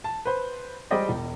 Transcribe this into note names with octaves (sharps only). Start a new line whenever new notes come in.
A5
B4 C5
G3 G#3 C5 D5 D#5 G5
E1